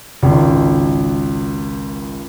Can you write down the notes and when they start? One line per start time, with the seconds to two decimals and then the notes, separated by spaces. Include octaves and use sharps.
0.23 G#1 C#2